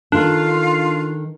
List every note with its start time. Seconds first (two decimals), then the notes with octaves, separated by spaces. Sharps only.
0.12 D#3 D4 F4 A4 F5